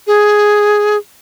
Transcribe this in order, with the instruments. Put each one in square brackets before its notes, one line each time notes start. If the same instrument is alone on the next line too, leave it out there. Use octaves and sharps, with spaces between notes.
[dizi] G#4